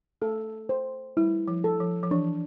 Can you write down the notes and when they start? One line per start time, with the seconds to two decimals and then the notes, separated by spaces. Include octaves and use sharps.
0.22 A3 A4
0.69 C5
1.17 G3 E4
1.48 F3
1.64 A4
1.80 F3
2.03 F3
2.11 E3 D4